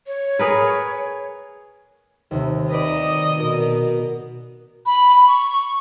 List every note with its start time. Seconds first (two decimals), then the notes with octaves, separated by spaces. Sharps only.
0.07 C#5
0.39 G#4 A#4 B4
2.31 D#2 C3
2.71 D#3 B4 D5 D#5
3.40 B2 A#4
4.86 B5
5.28 C#6